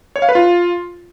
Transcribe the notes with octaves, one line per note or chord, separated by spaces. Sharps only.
C#5
F5
B4
F4